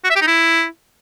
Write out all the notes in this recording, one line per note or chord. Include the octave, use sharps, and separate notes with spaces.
F#4
E5
G4
D#4
E4